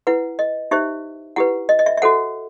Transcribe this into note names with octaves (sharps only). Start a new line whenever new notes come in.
E4 B4 F#5
D#5
D#4 G4 C5 E5
E4 G4 B4 F#5
D#5
D#5
E5
E5
F#4 A4 C5 F#5